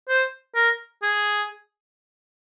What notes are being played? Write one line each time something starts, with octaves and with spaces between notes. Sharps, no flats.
C5
A#4
G#4